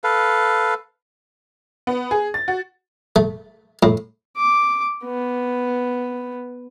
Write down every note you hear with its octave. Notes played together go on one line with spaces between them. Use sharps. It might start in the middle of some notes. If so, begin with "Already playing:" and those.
A4 B4 F5
B3
G#4
A6
F#4
A3
A2
D6
B3